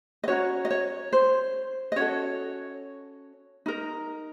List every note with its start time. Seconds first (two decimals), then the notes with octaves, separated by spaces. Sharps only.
0.24 D#5
0.28 C#4 F#4 A#4 C#5
0.65 D#5
0.70 C#5
1.13 C5
1.92 D#5
1.96 C#4 F#4 A4 C#5
3.66 D#4 A#4